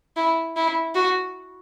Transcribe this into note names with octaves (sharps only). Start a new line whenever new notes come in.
E4
E4
F#4